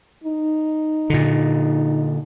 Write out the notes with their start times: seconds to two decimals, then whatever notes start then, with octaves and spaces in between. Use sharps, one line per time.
0.24 D#4
1.10 A#2 D3